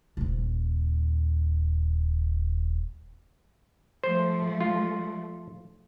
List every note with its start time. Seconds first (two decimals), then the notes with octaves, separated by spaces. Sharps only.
0.17 D#1 G#1
4.04 F3 G3 A3 C5
4.61 F4